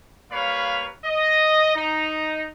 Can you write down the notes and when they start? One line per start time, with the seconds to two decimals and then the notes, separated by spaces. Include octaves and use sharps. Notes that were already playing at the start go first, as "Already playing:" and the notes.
0.31 G3 A#3 B4 C#5 F5 B5
1.04 D#5
1.75 D#4